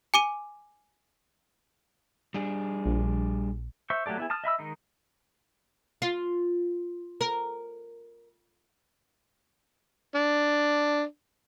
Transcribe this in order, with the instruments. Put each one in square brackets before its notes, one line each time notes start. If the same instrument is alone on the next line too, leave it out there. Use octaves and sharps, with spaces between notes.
[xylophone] G#5 D6 D#7
[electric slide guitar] G3 D4 G#4
[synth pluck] A#1
[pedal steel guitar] C5 E5 C#6
F#3 A3 G4 A4 D5
B3 E4 G#4
A5 D#6 F6
D#5 E5 B5 E6
D#3 G#3 D#4
[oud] F4
A#4
[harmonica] D4